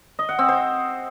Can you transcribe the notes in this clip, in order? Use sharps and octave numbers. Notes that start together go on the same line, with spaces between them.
D#5
F#5
C4
C5